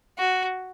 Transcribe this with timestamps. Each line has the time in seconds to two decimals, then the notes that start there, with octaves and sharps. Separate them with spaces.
0.18 F#4